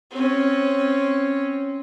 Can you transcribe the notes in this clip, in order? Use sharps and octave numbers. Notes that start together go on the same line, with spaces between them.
C4 C#4